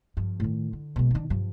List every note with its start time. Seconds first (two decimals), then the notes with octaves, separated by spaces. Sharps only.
0.17 G2 F3
0.40 A2 D#3
0.73 D3
0.96 B2 G#3
1.11 D#3 D4
1.30 G2 F3